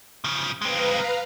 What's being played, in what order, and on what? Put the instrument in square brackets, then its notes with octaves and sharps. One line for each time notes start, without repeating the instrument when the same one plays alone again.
[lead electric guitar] C#3 F3
[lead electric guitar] G#3 C4 [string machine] B4 F5 A#5